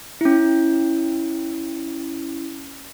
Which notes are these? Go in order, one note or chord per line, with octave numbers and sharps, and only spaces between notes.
C#4 E4